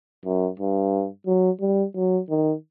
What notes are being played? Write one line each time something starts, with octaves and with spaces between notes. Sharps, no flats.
F#2
G2
F#3
G3
F#3
D#3